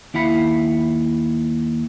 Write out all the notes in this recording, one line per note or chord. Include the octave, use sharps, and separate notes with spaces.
D#2 E4 F5 F#5 B5